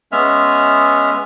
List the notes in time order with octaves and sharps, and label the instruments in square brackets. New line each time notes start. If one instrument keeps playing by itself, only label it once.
[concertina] G#3 B3 C#4 E5 F6